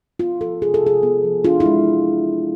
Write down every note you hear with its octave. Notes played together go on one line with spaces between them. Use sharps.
B3 F4
F3 A4
C3 G#4
A4
C3 G#4
B3
F3
D4 F4
E4
G#3